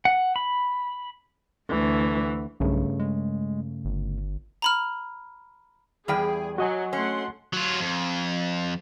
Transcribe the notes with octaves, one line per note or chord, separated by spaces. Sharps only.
F#5
B5
D2 E3
B1 G2 C#3 A3
G#3
G1
A#5 B5 F6
E2 G3 G#4 G5
F#3 F#4 D#5 G#5
A3 C#4 F#5 C6
F#3 F4
F2